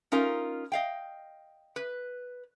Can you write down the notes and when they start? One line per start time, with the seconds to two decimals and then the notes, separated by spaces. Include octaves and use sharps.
0.12 C#4 D#4 F4 A#4
0.72 D#5 F5 G5
1.76 B4